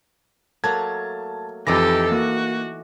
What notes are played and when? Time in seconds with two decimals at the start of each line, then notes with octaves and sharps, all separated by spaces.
0.64 F#3 A3 A#3 A5 G#6
1.67 F2 E3 A3 D#4 G4 A4 D6 A#6
2.12 A#3 F#4